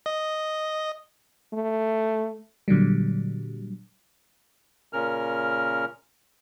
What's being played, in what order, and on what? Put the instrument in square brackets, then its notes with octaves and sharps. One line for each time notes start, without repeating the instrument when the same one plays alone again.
[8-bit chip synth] D#5
[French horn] A3
[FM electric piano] A#2 D3 F#3 G3
[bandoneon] A#2 C#3 C#4 A#4 F6